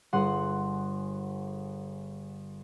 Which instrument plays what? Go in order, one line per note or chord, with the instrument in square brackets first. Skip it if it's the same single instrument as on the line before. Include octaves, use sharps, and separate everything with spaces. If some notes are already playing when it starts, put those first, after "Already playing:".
[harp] G1 G#4 F#5 C6